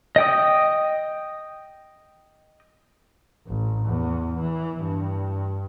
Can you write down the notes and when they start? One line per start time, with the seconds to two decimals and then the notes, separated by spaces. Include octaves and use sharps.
0.16 D#5 G5 D#6
3.47 A1
3.86 E2
4.38 E3
4.82 G2